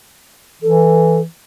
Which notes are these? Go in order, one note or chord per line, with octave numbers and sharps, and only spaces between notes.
E3 A4